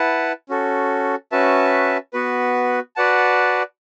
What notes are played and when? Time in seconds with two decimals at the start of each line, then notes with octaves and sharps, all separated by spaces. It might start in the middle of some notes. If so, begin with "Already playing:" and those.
Already playing: E4 B4 F#5 A5
0.49 C#4 F#4 A4
1.32 C#4 F#4 B4 E5 A5
2.13 B3 F#4 B4
2.96 F#4 B4 D5 F#5 A5